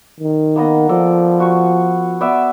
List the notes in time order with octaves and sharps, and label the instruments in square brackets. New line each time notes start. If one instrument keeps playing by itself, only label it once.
[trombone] D#3
[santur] A#3 B3 D#5
[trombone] F3 [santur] A4 D5
[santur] F#4 C#6
B3 D5 E5